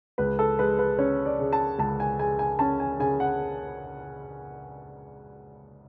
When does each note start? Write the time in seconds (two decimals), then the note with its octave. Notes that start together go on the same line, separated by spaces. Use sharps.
0.18 C#2 B4
0.39 A4
0.59 G#3 B4
0.79 B4
0.99 C#4 C#5
1.26 D5
1.39 C#3
1.53 A5
1.79 C#2 A5
2.00 G#5
2.19 G#3 G#5
2.39 G#5
2.59 C#4 A5
2.80 G#5
2.99 C#3 G#5
3.20 F#5